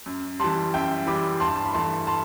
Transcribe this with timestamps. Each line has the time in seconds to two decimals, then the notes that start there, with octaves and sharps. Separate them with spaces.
0.06 F#2
0.40 E3 G3 A5 C6
0.74 F#2 E5 G5
1.07 E3 G3 B5 D6
1.40 G2 A5 C6
1.56 A5
1.65 B5
1.74 E3 A3 A5 C6
2.07 A5 C6